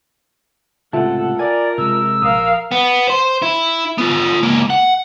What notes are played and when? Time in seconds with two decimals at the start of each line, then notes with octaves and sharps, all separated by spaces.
0.93 C#2 A2 C3 F4 A4 E5 F#5 A5
1.39 A#4 D5 G#5
1.78 C3 G#3 E6
2.22 A#1 A#4 F5 D#6
2.72 B3
3.07 C5 C6
3.42 E4
3.98 B3 F4
4.43 C#2 A#3
4.70 F#5